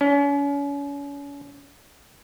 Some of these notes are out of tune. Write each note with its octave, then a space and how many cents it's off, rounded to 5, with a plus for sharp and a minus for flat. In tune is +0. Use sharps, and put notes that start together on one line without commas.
C#4 +35